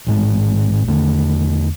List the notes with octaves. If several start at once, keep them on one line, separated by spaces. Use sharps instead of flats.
A1 G#2 G#3
E2 D3 A3